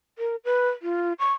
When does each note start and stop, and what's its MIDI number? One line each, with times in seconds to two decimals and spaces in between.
0.18 0.36 70
0.45 0.69 71
0.82 1.13 65
1.19 1.33 85